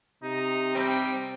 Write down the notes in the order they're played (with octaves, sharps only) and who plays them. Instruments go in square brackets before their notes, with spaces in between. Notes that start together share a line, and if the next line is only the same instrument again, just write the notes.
[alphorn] C3 [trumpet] D#4
[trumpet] G3 [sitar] C4